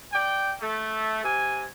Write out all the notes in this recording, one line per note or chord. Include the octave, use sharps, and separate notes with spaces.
D5 G5
A3
C3 G#5